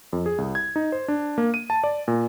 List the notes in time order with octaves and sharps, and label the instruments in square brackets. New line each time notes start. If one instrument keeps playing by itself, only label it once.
[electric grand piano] F2
G#4
C2
G#6
D#4
C5
D4
A#3
D#7
A5
D5
A#2